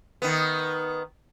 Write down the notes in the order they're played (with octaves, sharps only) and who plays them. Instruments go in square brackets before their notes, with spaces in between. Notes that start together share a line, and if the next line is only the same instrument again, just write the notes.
[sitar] D#3 B3